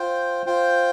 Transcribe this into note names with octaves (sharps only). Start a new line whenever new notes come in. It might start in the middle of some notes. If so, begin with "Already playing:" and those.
Already playing: F4 C5 G5
F4 C5 G5